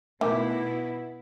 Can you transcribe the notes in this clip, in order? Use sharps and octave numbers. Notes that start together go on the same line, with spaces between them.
B2 D#3 A3 B3 E4 D6